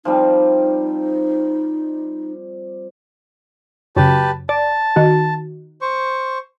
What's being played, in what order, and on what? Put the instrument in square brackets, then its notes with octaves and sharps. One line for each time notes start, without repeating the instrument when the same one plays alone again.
[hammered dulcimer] F3 G3 C4 [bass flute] D#4
[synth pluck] F#2 C#3 [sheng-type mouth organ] G4 B4 A5
[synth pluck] D5 [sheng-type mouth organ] A5
[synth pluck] D#3 F#4
[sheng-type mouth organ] C5 C#6